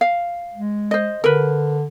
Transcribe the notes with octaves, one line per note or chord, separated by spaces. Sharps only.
F5
G#3
C5 D#5
D3 A#4 B4